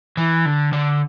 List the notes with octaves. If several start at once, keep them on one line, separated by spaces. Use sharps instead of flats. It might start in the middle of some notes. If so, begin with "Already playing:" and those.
E3
D3
D3